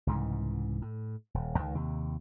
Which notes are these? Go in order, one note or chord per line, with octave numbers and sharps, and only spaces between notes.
C2 G#2 C#3 E3
A2
D#1
C#2 D#3
D#2 C3